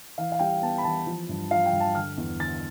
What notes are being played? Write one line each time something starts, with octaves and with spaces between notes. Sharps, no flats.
E3 F5
F5
G3 G5
B3 A5
B5
E3 A5
F3
G2
F3 F5
G5
G2
A5
D3 F6
E2
D3 A6